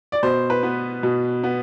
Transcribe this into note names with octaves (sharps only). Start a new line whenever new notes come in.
D5
B2 C5
B4
B3
B2
B3